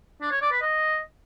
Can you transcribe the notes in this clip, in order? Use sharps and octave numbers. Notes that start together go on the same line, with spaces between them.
D4
C#5
D5
B4
D#5